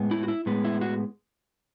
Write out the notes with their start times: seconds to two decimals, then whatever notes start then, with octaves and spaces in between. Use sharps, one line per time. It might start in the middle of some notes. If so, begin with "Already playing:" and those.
Already playing: A2 G#3 B3
0.11 E4
0.23 F#4
0.28 E4
0.46 A2 G#3 B3
0.65 E4
0.81 F#4